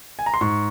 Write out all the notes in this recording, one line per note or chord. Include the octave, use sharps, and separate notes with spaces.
G#5
A#5
C6
G#2 C#6